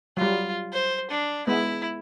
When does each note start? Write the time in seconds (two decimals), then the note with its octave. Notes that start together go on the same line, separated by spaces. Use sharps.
0.17 F#3 G3 F4
0.72 C5
1.10 D4
1.47 G#3 B3 E4